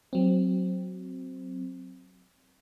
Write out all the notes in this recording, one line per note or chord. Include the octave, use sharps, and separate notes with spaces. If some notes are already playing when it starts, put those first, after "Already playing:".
F#3 C4